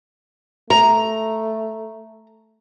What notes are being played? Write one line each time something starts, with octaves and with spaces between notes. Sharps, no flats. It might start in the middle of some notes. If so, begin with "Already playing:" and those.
A3 A#5